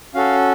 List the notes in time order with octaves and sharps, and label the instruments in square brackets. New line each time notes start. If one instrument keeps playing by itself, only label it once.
[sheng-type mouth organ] C#4 F#4 A4 F5